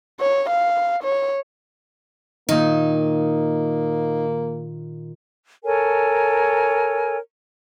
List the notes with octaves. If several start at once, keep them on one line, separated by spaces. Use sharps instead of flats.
C#5
F5
C#5
A#2 D#3 A#3 D#4
A4 A#4 C#5 G#5